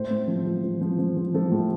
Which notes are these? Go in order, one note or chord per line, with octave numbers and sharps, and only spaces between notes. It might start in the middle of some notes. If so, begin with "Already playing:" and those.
Already playing: A2 C5
A2
F3
F3
F3
F3
F3
F3
F3 A4
A2